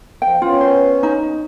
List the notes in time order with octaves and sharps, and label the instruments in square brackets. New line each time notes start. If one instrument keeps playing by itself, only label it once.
[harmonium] F3 [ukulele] G5
[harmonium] B3 C#4 [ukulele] F4
[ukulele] C5
D#4